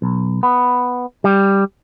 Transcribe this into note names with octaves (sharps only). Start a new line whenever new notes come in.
B1
B3
G3